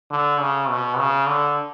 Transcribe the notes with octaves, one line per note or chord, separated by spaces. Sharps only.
D3
C#3
B2
C#3
D3